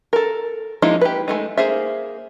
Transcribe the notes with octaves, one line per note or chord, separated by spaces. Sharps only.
A4 A#4
F3 G#3 A#3 D#4 E4
G4 B4
G#3 A3 D#4
A#3 G#4 C5 E5